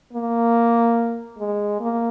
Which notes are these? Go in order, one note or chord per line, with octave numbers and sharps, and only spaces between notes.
A#3
G#3
A#3